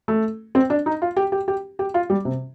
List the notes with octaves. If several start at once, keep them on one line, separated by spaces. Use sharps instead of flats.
A3
C4
D4
D#4
F4
G4
G4
G4
G4
F4
G3
C3